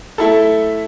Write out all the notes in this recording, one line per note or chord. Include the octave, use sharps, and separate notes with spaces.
A3 E4 A4